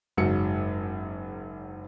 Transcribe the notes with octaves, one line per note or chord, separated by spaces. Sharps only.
F#1 G#2 F#3 C#7